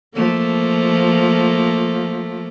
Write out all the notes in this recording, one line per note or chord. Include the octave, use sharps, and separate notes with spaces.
F3 A3 A#3